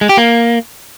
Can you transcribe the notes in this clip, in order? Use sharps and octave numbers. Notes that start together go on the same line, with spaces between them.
G#3
G4
A#3